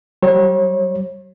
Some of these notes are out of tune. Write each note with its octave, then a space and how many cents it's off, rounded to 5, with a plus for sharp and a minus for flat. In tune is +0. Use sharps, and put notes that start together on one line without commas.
G3 -40 C#5 -40